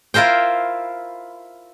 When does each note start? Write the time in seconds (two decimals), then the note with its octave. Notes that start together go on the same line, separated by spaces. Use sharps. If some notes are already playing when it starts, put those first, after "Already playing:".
0.14 E4 F4 A#4 C5 G5